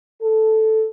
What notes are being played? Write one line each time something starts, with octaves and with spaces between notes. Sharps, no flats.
A4